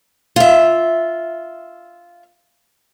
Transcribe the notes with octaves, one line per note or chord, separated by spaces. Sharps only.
F4 E5